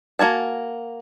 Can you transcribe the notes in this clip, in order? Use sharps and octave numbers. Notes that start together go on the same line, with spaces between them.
A#3 F#4 G#5 A5